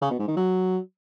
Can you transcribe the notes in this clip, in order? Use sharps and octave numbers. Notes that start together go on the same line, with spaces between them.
C#3
B2
G#2
D#3
F#3